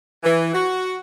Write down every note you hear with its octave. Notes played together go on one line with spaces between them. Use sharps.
E3
F#4